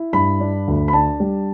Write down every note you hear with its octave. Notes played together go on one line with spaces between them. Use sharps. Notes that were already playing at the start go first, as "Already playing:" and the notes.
Already playing: E4
G2 B5
D4
D2
B5
D4 A5
G3